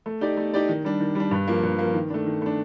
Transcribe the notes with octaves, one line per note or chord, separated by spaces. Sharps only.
A3
D#4 G4 D5
A3
D#4 G4 D5
D#3
G3 D4
D#3
G3 D4
G2
F3 A#3
G2
F3 A#3
D#3
A3 D4
D#3
A3 D4